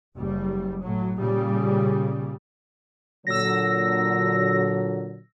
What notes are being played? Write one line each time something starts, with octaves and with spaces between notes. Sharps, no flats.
F#1 G3
A2 F#3
A#2 C#3 G3
A#2 D3 F#3 E6 A#6